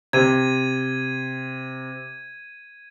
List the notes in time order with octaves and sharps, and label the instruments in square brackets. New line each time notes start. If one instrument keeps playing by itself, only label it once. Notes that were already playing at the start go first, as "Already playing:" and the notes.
[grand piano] C3 [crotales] G#6 D#7